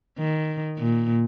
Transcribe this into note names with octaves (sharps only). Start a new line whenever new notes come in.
D#3
A#2